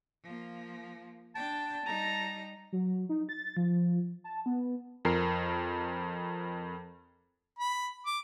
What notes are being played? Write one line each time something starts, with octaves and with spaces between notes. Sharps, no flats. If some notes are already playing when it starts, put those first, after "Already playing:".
F3 A#3
D4 G5 A5
G3 D#4 A#5
F#3
D#4
A6
F3
A5
B3
F2 A#4 C7
B5
D6